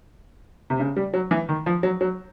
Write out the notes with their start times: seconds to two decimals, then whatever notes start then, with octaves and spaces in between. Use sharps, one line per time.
0.70 C3
0.80 C#3
0.97 G3
1.14 F#3
1.31 E3
1.49 D#3
1.66 F3
1.83 F#3
2.01 F#3